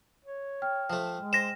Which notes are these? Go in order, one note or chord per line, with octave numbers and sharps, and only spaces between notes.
C#5
G5 F6
F3 A3
G#3
C5 A#6 E7